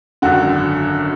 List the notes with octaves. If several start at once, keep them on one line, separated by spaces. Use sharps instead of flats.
G#1 F#2 D3 F#4